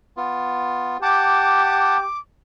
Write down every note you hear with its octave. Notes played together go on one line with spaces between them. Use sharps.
B3 F4
G4 F#5 A5 D6